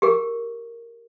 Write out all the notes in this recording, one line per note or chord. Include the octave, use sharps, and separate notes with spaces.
G4 G#4 A#4